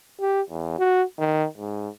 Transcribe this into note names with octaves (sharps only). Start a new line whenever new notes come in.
G4
E2
F#4
D#3
G#2